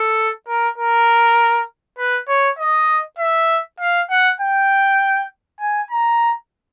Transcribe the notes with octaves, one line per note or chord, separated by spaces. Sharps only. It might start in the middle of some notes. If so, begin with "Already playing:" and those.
Already playing: A4
A#4
A#4
B4
C#5
D#5
E5
F5
F#5
G5
G#5
A#5